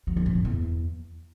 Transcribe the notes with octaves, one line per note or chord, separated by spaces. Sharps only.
F#3
F3
G#2
F#2
E2